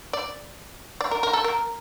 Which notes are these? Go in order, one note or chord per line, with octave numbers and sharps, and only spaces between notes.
D5
D5
A#4
A#4
A4
A#4